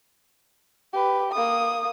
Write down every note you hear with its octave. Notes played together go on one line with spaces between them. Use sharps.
G4 B4
A#3 D#6